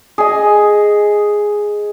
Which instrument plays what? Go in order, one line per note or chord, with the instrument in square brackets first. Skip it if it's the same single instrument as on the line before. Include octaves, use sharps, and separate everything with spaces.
[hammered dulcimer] G#4 D#5